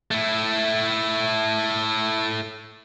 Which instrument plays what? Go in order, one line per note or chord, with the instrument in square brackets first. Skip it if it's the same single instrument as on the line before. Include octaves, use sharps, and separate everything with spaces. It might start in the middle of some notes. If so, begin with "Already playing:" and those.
[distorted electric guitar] A3 E4